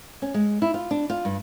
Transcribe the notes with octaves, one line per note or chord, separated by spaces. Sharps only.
C#4
G#3
E4
F4
D4
F4
G2